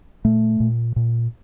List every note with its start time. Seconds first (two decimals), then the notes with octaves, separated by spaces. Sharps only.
0.25 A#2 A3
0.60 A#2
0.96 A#2